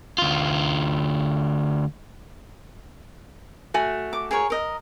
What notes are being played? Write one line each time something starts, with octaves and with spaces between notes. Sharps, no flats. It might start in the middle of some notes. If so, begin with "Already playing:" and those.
D2 F4
A3 F#4 G#5
D6
G#4 A#4 C#5
A#4 D#5